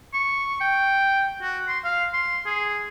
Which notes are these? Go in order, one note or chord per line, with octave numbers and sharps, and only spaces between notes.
C#6
G5
F#4
C6
F5
C6
G#4